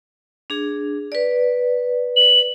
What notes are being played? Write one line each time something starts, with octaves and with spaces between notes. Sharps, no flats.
D4 G#4
B4 D5
F#7